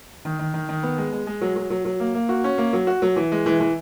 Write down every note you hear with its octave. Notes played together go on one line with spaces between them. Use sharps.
D#3
D#3
D#3
D#3
B3
G#3
G#3
G#3
F#3
F#3
F#3
F#3
A#3
A#3
F#4
C#4
A#3
F#3
F#4
F#3
E3
G#3
E3
E3